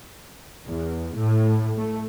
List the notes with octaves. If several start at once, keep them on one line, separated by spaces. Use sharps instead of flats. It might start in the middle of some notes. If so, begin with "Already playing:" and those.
E2
A2
A3